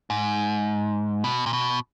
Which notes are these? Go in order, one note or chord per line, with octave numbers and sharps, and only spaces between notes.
G#2
B2
A#2
B2